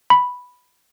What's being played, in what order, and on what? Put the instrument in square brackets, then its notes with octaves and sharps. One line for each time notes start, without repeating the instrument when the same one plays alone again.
[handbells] B5